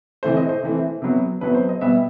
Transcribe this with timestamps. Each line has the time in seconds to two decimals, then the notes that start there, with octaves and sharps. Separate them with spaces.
0.23 C3 E3 A3 C5
0.37 D#5
0.49 C5
0.63 C3 E3 A3
1.02 C3 F#3 B3
1.41 C3 F#3 B3 B4
1.54 C5
1.69 D#5
1.81 B2 G3 B3 E5